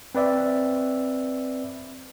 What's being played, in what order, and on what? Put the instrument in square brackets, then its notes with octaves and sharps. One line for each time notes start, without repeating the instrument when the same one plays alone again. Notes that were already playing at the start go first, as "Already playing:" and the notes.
[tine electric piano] C4 B4 D5 E5